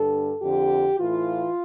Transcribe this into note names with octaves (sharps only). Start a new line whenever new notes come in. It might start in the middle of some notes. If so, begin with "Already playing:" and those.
Already playing: G2 D3 A4
F2 D3 G4
A2 E3 F4